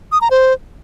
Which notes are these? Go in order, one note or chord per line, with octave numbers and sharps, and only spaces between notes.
D#6
A#5
C5